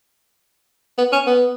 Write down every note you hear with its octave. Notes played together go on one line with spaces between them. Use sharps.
B3
C#4
B3